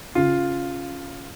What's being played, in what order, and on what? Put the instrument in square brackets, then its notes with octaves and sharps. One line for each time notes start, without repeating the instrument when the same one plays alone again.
[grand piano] C#3 F4